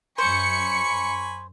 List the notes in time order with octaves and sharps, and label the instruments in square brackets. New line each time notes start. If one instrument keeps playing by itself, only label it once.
[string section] F#2 C#7 [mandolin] C5 [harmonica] G#5 B5 C#6